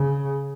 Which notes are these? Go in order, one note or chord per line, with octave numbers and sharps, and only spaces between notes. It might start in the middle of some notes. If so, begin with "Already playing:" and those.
Already playing: C#3